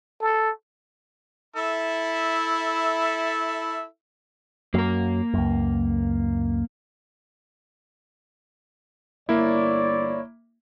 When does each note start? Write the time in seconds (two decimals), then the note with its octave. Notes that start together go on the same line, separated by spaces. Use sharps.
0.21 A4
1.56 E4 A4 E5
4.74 F#2 F#3 A#3 A#4
5.34 C#2 F#2
9.29 G1 A#3 E4 C#5 D5